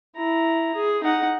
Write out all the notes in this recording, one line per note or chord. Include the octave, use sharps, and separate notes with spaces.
E4 A#5
G#4
D#4 F#5